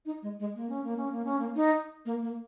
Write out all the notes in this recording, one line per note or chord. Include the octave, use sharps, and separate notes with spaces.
D#4
G#3
G#3
A#3
C#4
A#3
C#4
A#3
C#4
A#3
D#4
A#3
A#3